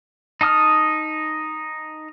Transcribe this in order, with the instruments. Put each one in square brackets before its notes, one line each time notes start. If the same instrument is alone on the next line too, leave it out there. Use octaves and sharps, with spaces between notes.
[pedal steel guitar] D#4 A5 D#6 F6